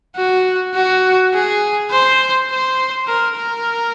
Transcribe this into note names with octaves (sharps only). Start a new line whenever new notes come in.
F#4
F#4
G#4
C5
C5
A#4
A#4